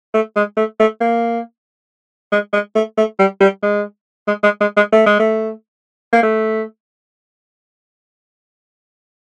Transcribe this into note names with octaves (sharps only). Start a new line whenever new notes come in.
A3
G#3
A3
A3
A#3
G#3
G#3
A3
A3
G3
G3
G#3
G#3
G#3
G#3
G#3
A3
G#3
A3
A#3
A3